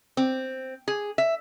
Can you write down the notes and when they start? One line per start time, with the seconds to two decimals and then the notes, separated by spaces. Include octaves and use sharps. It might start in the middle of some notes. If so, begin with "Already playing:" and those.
0.17 C4
0.88 G#4
1.18 E5